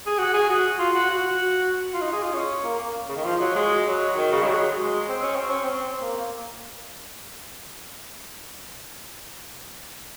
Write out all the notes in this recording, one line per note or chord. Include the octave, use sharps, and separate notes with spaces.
G#4
F#4
G#4
F#4
F4
F#4
F#4
F4
D#4
G#4
F4
C#4
A#3
A#3
C#3
D#3
F3
F#3
G#3
F#3
D#3
C#3
G#3
F#3
G#3
C4
C#4
C4
C#4
C4
A#3
A#3